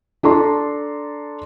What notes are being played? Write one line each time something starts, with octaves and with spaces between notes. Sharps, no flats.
D4 A4 A#5 C6